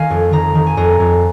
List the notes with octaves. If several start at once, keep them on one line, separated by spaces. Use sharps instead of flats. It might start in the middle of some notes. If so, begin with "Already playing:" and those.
Already playing: D#3 D#5 F5 G#5
F2
D#3 A#5
D#3
G#5
F2 A#5
F2